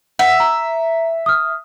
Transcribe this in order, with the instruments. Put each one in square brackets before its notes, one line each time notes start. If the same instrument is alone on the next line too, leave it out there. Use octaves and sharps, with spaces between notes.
[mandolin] E5 [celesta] F#5
[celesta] A#5
D#6 F6